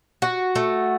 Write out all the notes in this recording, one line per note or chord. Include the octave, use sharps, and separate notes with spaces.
F#4
A3